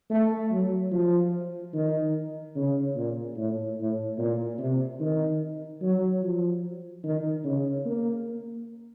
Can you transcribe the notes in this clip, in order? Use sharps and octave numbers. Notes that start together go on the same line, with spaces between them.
A3
F#3
F3
D#3
C#3
A#2
A2
A2
A#2
C3
D#3
F#3
F3
D#3
C#3
A#3